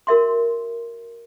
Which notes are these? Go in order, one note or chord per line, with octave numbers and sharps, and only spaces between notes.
F#4 A#4 E5 C6